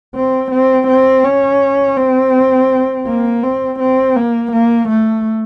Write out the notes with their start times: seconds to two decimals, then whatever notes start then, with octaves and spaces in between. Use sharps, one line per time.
0.15 C4
0.51 C4
0.88 C4
1.24 C#4
1.97 C4
3.07 A#3
3.43 C4
3.79 C4
4.16 A#3
4.52 A#3
4.89 A3